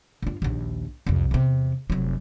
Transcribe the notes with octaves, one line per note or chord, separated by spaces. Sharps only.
G2 F4
A#1 D#2
C2 F2
E2 C3
F1 F#3